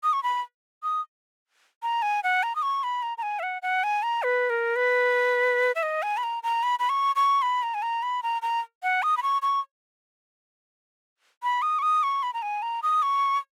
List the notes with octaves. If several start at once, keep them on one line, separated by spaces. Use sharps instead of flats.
D#6
C#6
B5
D#6
A#5
G#5
F#5
A#5
D#6
C#6
B5
A#5
A#5
G#5
E5
F#5
F#5
G#5
A#5
B4
A#4
B4
E5
D#5
G#5
B5
A#5
A#5
B5
B5
C#6
C#6
B5
A#5
G#5
A#5
B5
A#5
A#5
F#5
D#6
B5
C#6
C#6
B5
D#6
C#6
D#6
C#6
B5
A#5
G#5
A#5
D#6
C#6